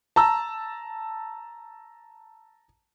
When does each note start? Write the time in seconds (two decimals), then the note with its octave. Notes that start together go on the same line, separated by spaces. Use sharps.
0.16 A5 A#5 E6